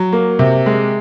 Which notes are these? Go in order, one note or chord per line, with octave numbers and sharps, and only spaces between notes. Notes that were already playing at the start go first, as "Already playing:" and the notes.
Already playing: F#3
A#3
C3
G#3